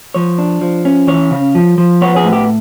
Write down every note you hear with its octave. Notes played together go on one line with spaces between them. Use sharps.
F3 C#5
D4
F3
C#4
E3 C#5
C#3
F3
F3
B3 C#5
G#4
A2
G4